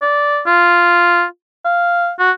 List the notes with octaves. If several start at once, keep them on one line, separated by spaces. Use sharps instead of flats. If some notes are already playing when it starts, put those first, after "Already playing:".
D5
F4
F5
F#4